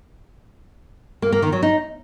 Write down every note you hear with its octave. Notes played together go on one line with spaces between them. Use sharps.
A#3
A#3
D#3
F#3
D#4